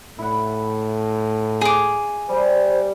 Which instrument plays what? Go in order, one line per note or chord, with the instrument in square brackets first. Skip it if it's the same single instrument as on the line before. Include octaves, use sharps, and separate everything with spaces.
[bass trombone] A2 [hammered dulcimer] E4 F#5
[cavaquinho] G#4 D6
[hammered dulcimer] G3 [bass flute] C5